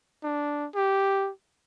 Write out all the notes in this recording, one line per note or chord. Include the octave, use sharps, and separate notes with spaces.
D4
G4